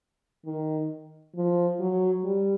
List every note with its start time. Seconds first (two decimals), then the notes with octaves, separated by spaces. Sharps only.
0.46 D#3
1.35 F3
1.80 F#3
2.25 G3